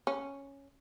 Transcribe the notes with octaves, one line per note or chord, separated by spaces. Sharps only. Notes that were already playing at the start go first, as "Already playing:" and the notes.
C#4